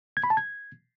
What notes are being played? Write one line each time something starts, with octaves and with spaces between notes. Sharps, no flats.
G#6
B5
A5
G#6